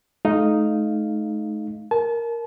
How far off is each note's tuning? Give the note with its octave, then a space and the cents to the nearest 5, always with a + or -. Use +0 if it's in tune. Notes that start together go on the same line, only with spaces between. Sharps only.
A3 -40 D#4 +0 F5 +0
A#4 +0 A5 -35